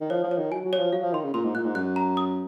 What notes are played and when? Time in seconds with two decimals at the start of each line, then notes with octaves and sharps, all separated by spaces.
0.01 D#3
0.10 F3 C#5
0.24 F3
0.31 C#5
0.38 D#3
0.52 F#3 G#5
0.65 F#3
0.73 C#5
0.79 F3
0.92 F#3 F5
1.03 F3
1.13 D#3 C6
1.24 C#3
1.34 A#2 C6
1.45 G#2
1.55 A#2 F#6
1.65 G#2
1.75 F#2 F#6
1.96 A#5
2.17 D#6